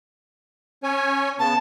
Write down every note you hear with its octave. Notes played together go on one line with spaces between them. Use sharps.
C#4 C#5 G#5
C#3 B3 A5